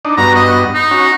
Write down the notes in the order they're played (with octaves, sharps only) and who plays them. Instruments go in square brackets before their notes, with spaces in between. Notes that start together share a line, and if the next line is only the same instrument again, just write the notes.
[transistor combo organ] D4 D#4
[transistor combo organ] G2 B3 F#4 [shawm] A#5
[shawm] D#5
D#4
[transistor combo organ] C#4 F#4